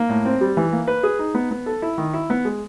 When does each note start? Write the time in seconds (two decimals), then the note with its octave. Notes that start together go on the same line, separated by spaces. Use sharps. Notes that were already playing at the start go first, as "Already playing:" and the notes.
Already playing: A#3
0.09 A2
0.25 C4
0.41 G3
0.57 E3
0.72 A#3
0.88 B4
1.03 G#4
1.19 D#4
1.35 B3
1.51 B3
1.66 A4
1.82 E4
1.98 D#3
2.14 E4
2.30 B3
2.45 G#3